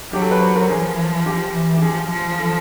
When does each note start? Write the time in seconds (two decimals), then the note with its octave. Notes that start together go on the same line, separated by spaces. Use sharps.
0.13 F#3 G4
0.22 A4
0.31 B4
0.41 C5
0.56 A#4
0.69 F3 G#4
1.26 G4
1.55 E3
1.76 G4
1.82 F3 G#4
2.10 F3
2.38 A4